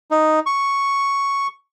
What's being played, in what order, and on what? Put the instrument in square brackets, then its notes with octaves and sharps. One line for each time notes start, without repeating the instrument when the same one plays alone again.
[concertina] D#4
C#6